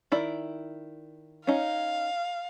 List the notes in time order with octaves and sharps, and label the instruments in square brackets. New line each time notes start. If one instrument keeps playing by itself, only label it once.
[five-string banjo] D#3 E4 D5
[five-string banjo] C#4 D#4 [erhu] F5